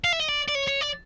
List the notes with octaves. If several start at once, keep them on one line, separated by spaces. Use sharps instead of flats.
F5
E5
D#5
D5
D5
C#5
C#5
D5